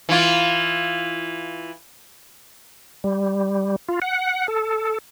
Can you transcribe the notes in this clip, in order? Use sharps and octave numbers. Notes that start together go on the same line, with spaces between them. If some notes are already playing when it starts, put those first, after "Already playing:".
E3 F4
G3
F4
F#5
A4